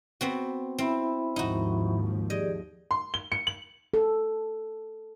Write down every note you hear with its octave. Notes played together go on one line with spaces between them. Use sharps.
B3 C4 F#4
C4 E4 E5 B5
D#2 G#2 F3 D#4 F#4
G4 G#4 D5 D#5
C6
G7
C#7
F#7
A4